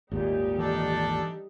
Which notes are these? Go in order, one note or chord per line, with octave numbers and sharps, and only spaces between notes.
G#1 D#2 A#2 G3 D#4 G4
E3 D4 A4